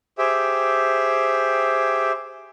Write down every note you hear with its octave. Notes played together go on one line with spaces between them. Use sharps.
G4 G#4 C5 E5 G5